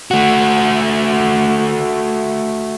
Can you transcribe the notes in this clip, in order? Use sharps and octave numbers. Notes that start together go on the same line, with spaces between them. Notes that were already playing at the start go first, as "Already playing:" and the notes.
A3 F#4